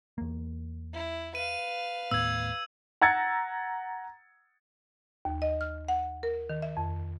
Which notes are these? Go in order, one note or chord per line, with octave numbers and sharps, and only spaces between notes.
E2 A#3
E4
B4 F5 D#7
D#2 A2 B3 E6 G#6
F#5 A#5 E6 G#6 A6 C#7
D#2
D#5
F6
F#5
A#4
D#3
E5
F2